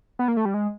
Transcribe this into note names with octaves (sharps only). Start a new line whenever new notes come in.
B3
A#3
A3
G3
G#3